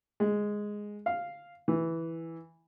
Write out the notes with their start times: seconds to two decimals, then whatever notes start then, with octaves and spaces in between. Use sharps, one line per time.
0.20 G#3
1.06 F5
1.68 E3